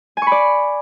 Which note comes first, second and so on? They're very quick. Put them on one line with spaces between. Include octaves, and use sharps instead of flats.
G#5 C#6 B5 D5